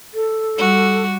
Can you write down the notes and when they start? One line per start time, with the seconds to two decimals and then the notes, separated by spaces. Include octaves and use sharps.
0.14 A4
0.56 G3 F#4